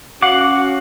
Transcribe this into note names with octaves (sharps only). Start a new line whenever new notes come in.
C#4 F#4 F5 F#5 D6